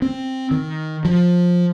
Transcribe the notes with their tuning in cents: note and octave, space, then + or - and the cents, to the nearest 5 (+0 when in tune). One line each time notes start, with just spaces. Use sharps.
C4 +5
D#3 +10
F3 +15